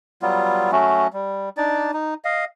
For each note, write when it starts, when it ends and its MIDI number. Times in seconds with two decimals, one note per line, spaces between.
0.22 0.71 54
0.22 0.71 55
0.22 0.71 59
0.22 0.71 65
0.72 1.07 54
0.72 1.07 57
0.72 1.07 61
0.72 1.07 66
1.13 1.49 55
1.57 1.91 62
1.57 1.91 63
1.57 1.91 74
1.93 2.14 63
2.25 2.45 75
2.25 2.45 77